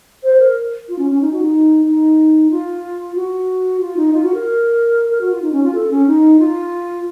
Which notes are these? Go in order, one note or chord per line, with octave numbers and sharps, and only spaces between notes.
C5
A#4
F4
C#4
C#4
D#4
F#4
D#4
D#4
F4
F#4
F4
D#4
F4
F#4
A#4
A#4
F#4
F4
D#4
C#4
F4
A4
C#4
D#4
F4